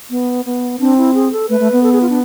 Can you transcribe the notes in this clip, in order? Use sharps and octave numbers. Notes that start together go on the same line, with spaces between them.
B3
B3
C4 D4
E4
G#4
A4
A3 B4
A3
B3
A4
G#4
F4
D4